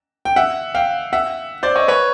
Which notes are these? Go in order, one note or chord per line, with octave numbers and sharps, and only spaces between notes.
G5
E5 F#5
F5 G5
E5 F#5
C5 D5
C#5 D#5
B4 C#5